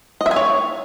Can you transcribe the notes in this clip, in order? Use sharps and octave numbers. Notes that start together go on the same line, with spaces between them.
D#5
E5
G#5
C#5